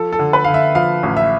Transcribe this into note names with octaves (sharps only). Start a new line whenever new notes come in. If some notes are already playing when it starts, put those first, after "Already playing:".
Already playing: F3 A4
A4
D3
B4
D3 F5
E5
F3 F5
A1
E5